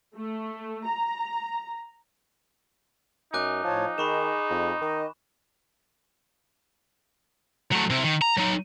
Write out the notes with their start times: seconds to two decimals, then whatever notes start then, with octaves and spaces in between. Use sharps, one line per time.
0.16 A3
0.87 A#5
3.34 F#2 D#4 G#5 D6 F#6
3.64 A2 F3 C#5 A5
3.98 D#3 G#4 B5 C#6 E7
4.50 F2
4.82 D#3 D#5
7.72 F#3 A3
7.90 C3 E4
8.04 D#3
8.22 A#5
8.37 F#3 D#4